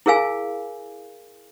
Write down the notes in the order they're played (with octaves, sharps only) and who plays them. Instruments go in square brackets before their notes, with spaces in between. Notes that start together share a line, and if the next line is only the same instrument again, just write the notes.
[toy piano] E4 G#4 A#4 F5 G#5